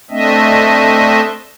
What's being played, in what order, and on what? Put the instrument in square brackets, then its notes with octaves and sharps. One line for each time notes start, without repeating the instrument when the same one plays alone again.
[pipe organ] A3 C4 D4 D#5 E5